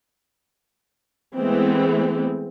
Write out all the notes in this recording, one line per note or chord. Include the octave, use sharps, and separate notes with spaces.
E3 G#3 A3 B3 C4